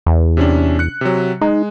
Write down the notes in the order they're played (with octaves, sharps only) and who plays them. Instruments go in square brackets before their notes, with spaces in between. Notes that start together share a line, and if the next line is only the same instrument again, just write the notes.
[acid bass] E2
[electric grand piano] C3 C#4 D4
F#6 C#7
C3 F#3
[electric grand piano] G#3 [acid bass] D#4